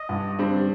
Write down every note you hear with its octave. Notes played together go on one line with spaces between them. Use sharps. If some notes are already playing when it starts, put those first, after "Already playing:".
Already playing: D#5
G2
D3 G3 C4